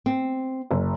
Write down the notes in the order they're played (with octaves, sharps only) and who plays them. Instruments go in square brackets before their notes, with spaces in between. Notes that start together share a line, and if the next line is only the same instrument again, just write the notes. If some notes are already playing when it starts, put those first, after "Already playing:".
[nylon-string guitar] C4
[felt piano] F#1